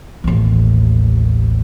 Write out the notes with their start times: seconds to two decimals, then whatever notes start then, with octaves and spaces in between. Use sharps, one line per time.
0.24 A1 D#2